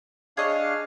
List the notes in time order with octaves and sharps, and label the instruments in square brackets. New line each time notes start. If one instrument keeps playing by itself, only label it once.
[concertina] D4 F5 [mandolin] G#4 C#5 D#5